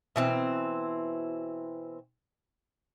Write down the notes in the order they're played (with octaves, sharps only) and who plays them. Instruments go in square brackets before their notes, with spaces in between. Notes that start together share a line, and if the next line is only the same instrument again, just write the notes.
[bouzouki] B2 E3 C4